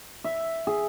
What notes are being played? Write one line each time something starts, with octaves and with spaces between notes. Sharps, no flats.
E5
G#4